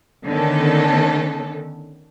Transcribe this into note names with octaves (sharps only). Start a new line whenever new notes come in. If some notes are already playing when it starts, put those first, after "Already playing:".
D3 D#3 A3 B3 C#4 A4